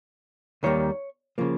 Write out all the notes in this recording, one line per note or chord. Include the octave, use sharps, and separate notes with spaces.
D#2 D#3 G3 A#3 C#5
C#3 F3 A#3